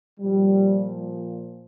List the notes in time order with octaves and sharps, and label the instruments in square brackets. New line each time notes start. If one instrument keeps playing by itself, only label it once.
[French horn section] A#2 F3 G3